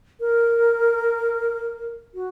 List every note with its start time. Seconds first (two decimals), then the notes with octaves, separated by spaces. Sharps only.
0.20 A#4
2.15 F#4